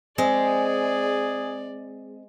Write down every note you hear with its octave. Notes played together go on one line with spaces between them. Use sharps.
G#3 C4 G#4 D5